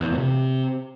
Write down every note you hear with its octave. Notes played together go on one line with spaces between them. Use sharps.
E2
C3
A#2
C3